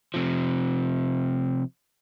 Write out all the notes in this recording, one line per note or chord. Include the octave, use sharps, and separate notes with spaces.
C3 F3